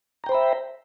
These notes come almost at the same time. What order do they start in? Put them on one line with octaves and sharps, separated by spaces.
A#5 G5 C5 B5 E5